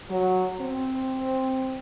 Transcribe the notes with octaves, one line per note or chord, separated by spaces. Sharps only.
F#3
C4